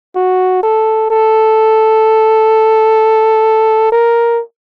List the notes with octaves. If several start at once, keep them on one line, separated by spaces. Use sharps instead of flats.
F#4
A4
A4
A#4